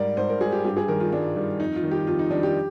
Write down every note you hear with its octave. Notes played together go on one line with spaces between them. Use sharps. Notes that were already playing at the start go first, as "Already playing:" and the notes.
Already playing: G#2 G3 A#4 D5
G#2 C5
A#4
G3 G#4
G4
G2 G4
G#4
D#3 G3 A#4
F4
G2 D4
D#3 G3
F2 D#4
F4
D#3 G3
G4
F2 F4
D#4
D#3 G3 D4
G4